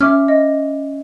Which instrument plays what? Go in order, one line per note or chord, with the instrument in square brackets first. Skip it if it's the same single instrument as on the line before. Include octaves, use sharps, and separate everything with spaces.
[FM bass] C#4 [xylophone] E5 D6 F6
[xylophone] D#5